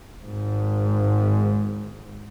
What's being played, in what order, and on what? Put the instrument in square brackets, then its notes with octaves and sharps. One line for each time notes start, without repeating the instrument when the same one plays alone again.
[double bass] G#1 G#2